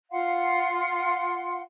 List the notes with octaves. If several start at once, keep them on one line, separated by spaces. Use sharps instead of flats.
F4 F5 F#5 C6